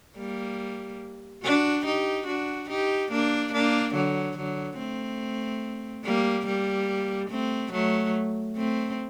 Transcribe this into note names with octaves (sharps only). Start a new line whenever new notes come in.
G3 A#3
D4 F#4
D#4 G4
D4 F#4
D#4 G4
A#3 D4
A#3 D4
D3 F#3
D3 F#3
A3 C4
G3 A#3
G3 A#3
A3 C4
F#3 A3
A3 C4